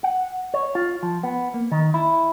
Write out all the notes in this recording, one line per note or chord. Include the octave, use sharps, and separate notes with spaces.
F#5
C#5
F4
F3
B3
A#3
D#3
E4